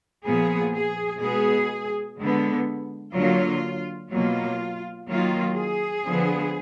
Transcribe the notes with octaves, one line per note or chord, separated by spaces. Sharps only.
A#2 F3 B3 G#4
G#4
B2 G#3 B3 G#4
D3 G#3 B3
D3 F#3 A#3 F4
B2 F#3 A#3 F4
D#3 F#3 A#3 F4
G#4
D3 F3 B3